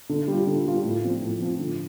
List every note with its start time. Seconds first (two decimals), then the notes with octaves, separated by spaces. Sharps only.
0.09 D3
0.28 G3 F4
0.47 D3
0.65 G3 F4
0.84 A2
1.03 F3 C4 F4
1.22 A2
1.40 F3 C4 F4
1.59 D3